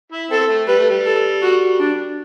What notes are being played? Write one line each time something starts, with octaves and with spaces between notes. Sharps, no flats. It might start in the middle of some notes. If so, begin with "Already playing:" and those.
E4
C4 A4
A3
G3 B4
A3
G3
A4
F#4
D4